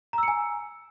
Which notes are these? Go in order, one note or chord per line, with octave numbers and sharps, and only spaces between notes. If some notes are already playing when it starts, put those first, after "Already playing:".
G#5 A#5 E6 C#7